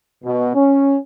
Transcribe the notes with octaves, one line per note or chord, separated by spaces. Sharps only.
B2
C#4